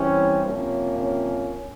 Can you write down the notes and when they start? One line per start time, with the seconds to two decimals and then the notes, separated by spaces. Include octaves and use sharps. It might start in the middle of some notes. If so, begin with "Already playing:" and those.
Already playing: E3 G3 C4 C#4
0.46 C3 F3 A#3 C#4
1.00 C#4